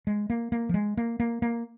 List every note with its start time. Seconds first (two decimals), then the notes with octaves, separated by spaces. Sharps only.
0.07 G#3
0.30 A#3
0.52 A#3
0.69 F3
0.74 G#3
0.97 A#3
1.20 A#3
1.42 A#3